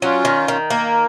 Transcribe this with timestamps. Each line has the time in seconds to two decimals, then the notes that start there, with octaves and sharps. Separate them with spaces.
0.02 F#3 C#4 F4
0.25 D#3
0.48 D#3
0.70 A#3